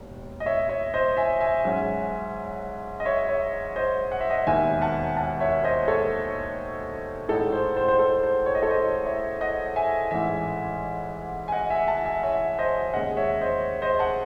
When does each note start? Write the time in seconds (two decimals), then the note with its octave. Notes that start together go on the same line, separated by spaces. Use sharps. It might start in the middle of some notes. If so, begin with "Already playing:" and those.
Already playing: E1 D#2
0.40 D#5
0.46 C#5 E5
0.69 C#5 E5
0.94 C5 D#5
1.17 E5 G#5
1.40 E5 G#5
1.65 G#2 F#3 C#4
3.00 D#5
3.05 C#5 E5
3.29 C#5 E5
3.76 C5 D#5
4.12 F#5
4.21 E5
4.30 D#5 F#5
4.47 E1 D#2 D#3 E5 G#5
4.82 F#5 A5
5.17 F#5 A5
5.40 C#5 E5
5.64 C5 D#5
5.88 A4 C#5
7.28 A1 A2 G#3 D#4 A4
7.52 C5
7.77 C5
7.88 C5
7.99 A4
8.24 C5
8.46 C#5
8.55 D#5
8.62 A4 C#5
8.70 C5 D#5
9.05 C#5 E5
9.41 D#5 F#5
9.76 E5 G#5
10.11 A1 G#2 E3 E5 G#5
11.48 G#5
11.52 D#5 F#5
11.70 E5 G#5
11.88 F#5 A5
12.05 E5 G#5
12.23 C#5 E5
12.58 C5 D#5
12.93 D#2 C#3 G#3 C#4 D#5 F#5
13.17 C#5 E5
13.41 C5 D#5
13.82 C5 D#5
13.99 F#5 A5